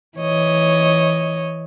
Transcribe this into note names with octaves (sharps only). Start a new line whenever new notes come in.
E3 C#5 D#5